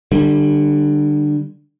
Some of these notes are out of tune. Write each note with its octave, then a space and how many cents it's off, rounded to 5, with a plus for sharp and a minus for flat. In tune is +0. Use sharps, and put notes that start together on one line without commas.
D3 +20 G3 +0